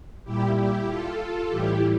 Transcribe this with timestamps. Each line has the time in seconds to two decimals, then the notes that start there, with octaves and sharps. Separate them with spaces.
0.24 A#2 G3 E4 G4
0.55 E4 G4
0.86 F4 A4
1.48 A2 E3 G3 E4 G4